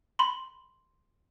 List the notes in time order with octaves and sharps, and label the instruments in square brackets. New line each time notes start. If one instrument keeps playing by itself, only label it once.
[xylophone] B5 C6